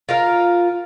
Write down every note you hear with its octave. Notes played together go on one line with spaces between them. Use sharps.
F4 A#4 F5